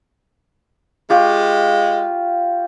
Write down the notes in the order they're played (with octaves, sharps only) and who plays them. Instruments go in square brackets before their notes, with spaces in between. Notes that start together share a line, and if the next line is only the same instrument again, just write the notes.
[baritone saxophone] G#3 [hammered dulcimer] F4 G4 C#6